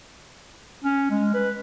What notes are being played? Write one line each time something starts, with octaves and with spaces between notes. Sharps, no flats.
C#4
G#3
B4